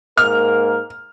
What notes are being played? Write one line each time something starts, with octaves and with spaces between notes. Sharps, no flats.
G#2 A#3 A#4 F6